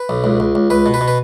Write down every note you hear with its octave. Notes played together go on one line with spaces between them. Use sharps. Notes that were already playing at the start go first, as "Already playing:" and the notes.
Already playing: B4
B1
C#2
C#2
C#2
C#2 B4
B2
B4
B2
B4